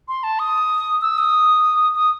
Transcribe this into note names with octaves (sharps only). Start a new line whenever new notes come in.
C6
A5
D#6
E6
D#6
D#6